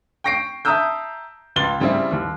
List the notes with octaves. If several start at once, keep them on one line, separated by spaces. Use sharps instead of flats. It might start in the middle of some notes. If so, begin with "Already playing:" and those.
G5 C#6 A#6 C7 D7
E5 A5 A#5 D#6 E6 G6
C#2 C6 A6 G7
C#3 G3 C4 E4
D#2